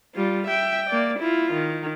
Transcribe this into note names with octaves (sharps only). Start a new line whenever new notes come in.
G3 F4
E5 G5
A#3 D5
E4 F4
D#3